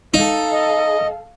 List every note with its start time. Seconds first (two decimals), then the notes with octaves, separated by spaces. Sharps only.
0.14 D#4 A4 F5
0.53 D#5